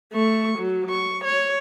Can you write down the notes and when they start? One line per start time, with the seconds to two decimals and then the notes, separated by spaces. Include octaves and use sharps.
0.13 A3 C#6
0.58 F#3
0.90 C#6
1.25 C#5